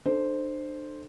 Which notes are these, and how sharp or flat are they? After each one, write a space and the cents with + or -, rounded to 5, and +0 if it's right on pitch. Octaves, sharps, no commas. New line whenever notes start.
D4 +35 A4 -5 C5 +0